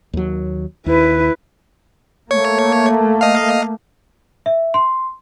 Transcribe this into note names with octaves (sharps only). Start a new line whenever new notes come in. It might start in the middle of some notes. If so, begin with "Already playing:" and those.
D#2 F#3
D#2 E4 B4
A3 A#3 C#5
D#5 F5
E5
C6